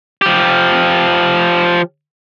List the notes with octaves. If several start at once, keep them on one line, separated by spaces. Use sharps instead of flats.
F3 G4